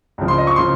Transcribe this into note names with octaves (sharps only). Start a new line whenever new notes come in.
C#2 C#3 F3
C6
D#5
C#6
C#3 F3 C6